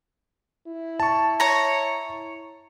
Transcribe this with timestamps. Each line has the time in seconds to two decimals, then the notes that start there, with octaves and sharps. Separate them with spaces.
0.67 E4
1.00 A5 C#6
1.40 C#5 A#5